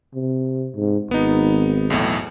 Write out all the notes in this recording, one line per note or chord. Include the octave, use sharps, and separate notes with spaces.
C3
G#2
G#1 B3 D#4
B1 E2 A2